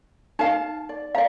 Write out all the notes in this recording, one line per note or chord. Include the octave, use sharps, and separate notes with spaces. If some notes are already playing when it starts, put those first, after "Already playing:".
D#4 F5 A5
D5
D5 F5 A#5